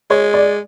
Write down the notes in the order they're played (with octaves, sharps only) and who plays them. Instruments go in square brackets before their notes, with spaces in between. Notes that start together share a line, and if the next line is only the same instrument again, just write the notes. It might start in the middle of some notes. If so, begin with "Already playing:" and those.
[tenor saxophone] G#3 [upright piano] C#5
[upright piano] D5